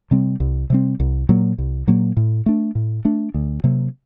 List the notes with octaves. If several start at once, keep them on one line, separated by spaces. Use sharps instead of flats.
C3 G3 C4
C2
C3 G3 C4
C2
A#2 F#3 A#3
C2
A#2 F#3 A#3
A2
A3 D4
A2
A3 D4
D2
C3 F#3 A#3